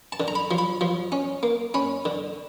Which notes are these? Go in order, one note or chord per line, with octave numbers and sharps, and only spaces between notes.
A5
D3
A#5
B5
F3
B5
F3
C#4
A#3
C#4 B5
D3